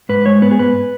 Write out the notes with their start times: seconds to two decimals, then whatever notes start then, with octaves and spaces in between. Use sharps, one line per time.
0.09 G#2 B4
0.26 G#3 C#5
0.42 B3 B4
0.51 G#4
0.59 G#2 B4